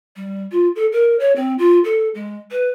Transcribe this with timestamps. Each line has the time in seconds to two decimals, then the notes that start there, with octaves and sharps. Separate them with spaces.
0.16 G3
0.52 F4
0.76 A4
0.92 A#4
1.20 C#5
1.36 C4
1.59 F4
1.84 A4
2.15 G#3
2.51 B4